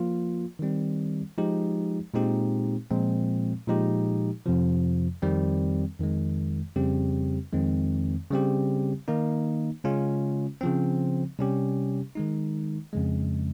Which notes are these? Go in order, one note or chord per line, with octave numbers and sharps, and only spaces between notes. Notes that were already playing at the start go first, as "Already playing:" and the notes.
Already playing: F3 A#3 F4
D#3 G3 C4
F3 G#3 D#4 G4
A#2 G#3 C4 D#4 G4
A#2 F3 G#3 C4
A#2 F3 G#3 D#4 G4
F2 C3 F3
F2 D#3 G3 C4
F2 D#3 G#3
F2 C#3 G3 C4 G4
F2 D#3 G#3 C4
C#3 G3 C4 G4
D#3 A#3 D#4
C#3 G#3 C#4 F4
C#3 F3 C4
C3 G3 C#4 G4
D#3 G#3 D#4
F2 C#3 G#3